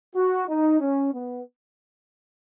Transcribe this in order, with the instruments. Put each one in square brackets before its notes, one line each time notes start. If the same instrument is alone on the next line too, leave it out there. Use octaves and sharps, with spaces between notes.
[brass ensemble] F#4
D#4
C#4
B3